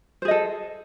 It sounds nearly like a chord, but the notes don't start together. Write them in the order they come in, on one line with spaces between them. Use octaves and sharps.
C5 G#4 D#5 A4